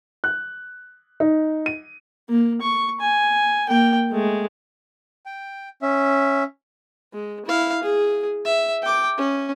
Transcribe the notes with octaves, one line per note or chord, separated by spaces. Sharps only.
F#6
D#4
D#7
A#3
C#6
G#5
A#3 G5
G#3 A3
G5
C#4 E5
G#3
E4 F5
G#4
E5
G5 D6
C#4